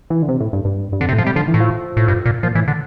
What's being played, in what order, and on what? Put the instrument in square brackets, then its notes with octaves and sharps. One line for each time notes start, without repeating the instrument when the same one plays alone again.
[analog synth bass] E3
D3
C3
A2
G2
G2
G2
[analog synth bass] F2 [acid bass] D3
[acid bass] C3
[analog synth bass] A2
[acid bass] F3
[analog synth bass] C3 [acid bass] G3
[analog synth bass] D3 [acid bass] F3
[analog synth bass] E3
[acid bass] A2
[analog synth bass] F3
[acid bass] A2
G2
A#2
[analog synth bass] A#2 [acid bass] F3
[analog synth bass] A2 [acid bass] E3
[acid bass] D3